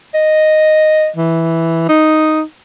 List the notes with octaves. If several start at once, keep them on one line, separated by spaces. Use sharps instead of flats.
D#5
E3
D#4